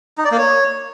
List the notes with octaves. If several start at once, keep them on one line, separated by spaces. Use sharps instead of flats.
D#4
D5
A#3
C#5